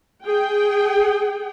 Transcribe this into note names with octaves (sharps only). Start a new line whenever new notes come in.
G#4 G5